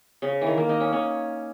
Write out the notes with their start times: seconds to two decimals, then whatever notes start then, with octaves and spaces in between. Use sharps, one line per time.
0.22 C#3
0.41 E3
0.46 D#3
0.58 A#3
0.69 D#4
0.80 C#4
0.92 C#4